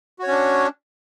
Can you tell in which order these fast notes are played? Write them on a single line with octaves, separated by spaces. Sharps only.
F#4 C#5 C#4 D4